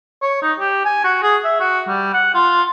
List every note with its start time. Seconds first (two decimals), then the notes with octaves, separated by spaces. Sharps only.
0.22 C#5
0.43 D#4
0.59 G4
0.85 G#5
1.04 F#4
1.23 G#4
1.45 E5
1.60 F#4
1.88 G3
2.14 F#5
2.35 F4